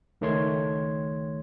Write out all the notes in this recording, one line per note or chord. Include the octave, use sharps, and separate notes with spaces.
C#2 D#3 A3 C#5 C6 G#6